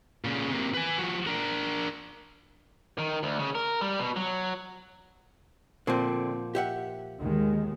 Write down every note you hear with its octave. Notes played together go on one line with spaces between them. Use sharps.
A#2 C#3
C3 A#3
B4 G#5
F3 F#4
D4 A#4
D#3
D2
C#3
A#4
G3
B2
F#3
A#2 D3 F3 C4 C5
G4 E5 F#5
D#2 D#3 G#3